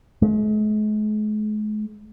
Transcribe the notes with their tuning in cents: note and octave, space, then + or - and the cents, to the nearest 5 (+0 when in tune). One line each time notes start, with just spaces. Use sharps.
G#3 +45